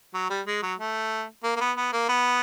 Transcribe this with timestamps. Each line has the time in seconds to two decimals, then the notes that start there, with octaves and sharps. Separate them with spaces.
0.14 F#3
0.30 G3
0.47 G#3
0.63 F#3
0.79 A3
1.44 A#3
1.56 A#3
1.61 B3
1.77 B3
1.93 A#3
2.09 B3